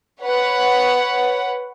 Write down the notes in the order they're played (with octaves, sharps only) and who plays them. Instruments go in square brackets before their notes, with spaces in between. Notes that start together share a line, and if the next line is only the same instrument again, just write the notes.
[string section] B4 C#5 F#5